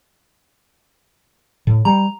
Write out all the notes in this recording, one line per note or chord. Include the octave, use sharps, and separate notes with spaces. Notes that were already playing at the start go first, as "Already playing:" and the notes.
A2
G3 A#5